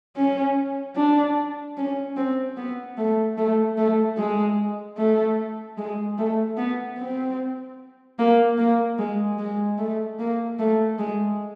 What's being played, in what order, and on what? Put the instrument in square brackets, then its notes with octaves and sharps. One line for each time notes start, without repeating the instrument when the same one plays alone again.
[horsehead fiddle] C#4
D4
C#4
C4
B3
A3
A3
A3
G#3
A3
G#3
A3
B3
C4
A#3
A#3
G#3
G#3
A3
A#3
A3
G#3